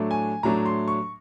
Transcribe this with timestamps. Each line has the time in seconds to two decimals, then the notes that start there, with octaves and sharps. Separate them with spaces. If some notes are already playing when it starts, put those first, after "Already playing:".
Already playing: A2 F#3 A3 D4
0.11 G#5
0.43 A2 F#3 A3 D4 A#5
0.66 C6
0.88 C#6